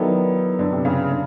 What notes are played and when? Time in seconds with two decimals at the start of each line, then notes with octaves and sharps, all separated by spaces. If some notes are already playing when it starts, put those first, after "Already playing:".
Already playing: D#3 F#3 B3 E4 A4 D5
0.59 D3
0.73 C3
0.85 C#3
1.11 D3